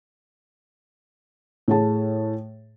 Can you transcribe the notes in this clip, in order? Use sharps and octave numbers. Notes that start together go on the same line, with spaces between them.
A2 G#4 A5